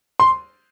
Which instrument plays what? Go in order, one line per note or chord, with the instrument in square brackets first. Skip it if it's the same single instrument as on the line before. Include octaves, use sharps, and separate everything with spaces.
[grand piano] C6